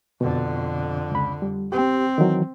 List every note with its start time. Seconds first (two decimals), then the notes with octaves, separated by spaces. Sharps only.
0.21 F2 B2 D3
1.11 C#2 B5
1.42 G3
1.72 C4 G4
2.18 D#3 E3 F#3